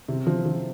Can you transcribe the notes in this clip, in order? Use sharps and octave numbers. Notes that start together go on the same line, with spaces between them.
C3
F3
F3